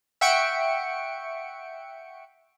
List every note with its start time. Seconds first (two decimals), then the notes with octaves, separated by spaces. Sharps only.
0.21 E5 F#5 G5 C#6 C#7 D7